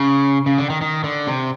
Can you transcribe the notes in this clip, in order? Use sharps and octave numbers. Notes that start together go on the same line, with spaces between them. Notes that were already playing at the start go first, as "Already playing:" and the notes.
Already playing: C#3
C#3
D3
D#3
D#3
D3
C3